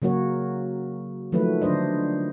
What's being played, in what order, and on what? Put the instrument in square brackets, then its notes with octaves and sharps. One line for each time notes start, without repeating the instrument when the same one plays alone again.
[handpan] C#3 F#3 A#3 F#4 C#5
D#3 F3 F#3 A3 B4
D3 F#3 D4 C5 D#5